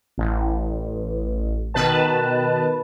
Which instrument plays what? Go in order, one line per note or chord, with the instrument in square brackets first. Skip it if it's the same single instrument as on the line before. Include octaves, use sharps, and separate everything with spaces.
[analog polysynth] A1
B2 D#3 B4 A5